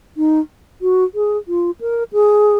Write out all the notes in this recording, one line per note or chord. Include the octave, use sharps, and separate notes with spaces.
D#4
F#4
G#4
F4
A#4
G#4